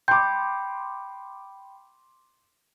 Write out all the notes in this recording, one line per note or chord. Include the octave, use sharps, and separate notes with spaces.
G5 B5 C6 D6 G6